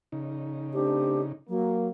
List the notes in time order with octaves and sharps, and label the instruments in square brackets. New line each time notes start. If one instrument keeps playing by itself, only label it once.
[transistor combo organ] C#3 D#4
[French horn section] A3 C4 D4 [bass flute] G4
[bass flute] F#3 [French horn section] A#3